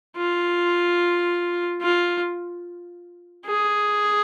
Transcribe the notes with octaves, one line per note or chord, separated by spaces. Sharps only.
F4
F4
G#4